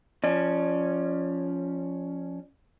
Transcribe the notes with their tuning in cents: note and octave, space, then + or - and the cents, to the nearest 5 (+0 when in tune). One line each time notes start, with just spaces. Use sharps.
F3 +0 C#4 +0 D5 +30